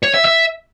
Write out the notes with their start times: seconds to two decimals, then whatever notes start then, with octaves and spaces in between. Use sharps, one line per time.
0.03 C#5
0.14 E5
0.25 E5